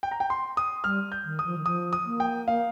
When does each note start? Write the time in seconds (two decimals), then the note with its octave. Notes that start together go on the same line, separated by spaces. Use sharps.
0.03 G5
0.11 A#5
0.20 G5
0.30 C6
0.57 D#6
0.84 G3 F6
1.12 G6
1.25 D#3
1.39 D#6
1.45 F3
1.58 D#3
1.66 F3 D#6
1.93 D#6
2.06 A#3
2.20 G5
2.48 F5